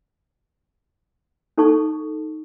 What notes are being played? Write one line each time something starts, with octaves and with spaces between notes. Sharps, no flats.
D#4 A4 A5 C#6